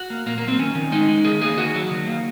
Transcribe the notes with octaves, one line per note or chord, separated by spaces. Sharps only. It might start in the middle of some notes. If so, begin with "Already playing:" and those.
Already playing: F#4
A#3
A#2 A#3
F#3 A#3
C4
D#3 C#4
D#3
G#3 D#4
G#3
D#3 G#4
A#3 G#4
D#3 F#4
F#3
D#3
A#3